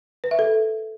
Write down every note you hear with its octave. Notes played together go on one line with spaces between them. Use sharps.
B4
E5
A4